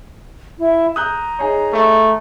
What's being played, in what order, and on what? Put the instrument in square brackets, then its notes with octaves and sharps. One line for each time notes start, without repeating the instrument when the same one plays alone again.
[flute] E4
[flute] A#5 [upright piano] D#6 F#6 G6
[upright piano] D#4 G#4 C#5
[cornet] A3